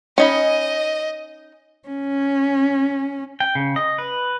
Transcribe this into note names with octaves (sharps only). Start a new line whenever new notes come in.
C#4 D#4 D#5 B5
C#4
G5
C#3
D#5
B4